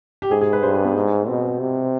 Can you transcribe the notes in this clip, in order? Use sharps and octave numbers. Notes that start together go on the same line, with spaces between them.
G4
G#2 G#4
G#4
B4
G2 C5
G#4
B3
G#2
B2 C4
C3